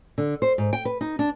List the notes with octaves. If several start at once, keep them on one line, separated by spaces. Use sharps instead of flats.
D3
C5
G#2
G5
B4
D#4
D4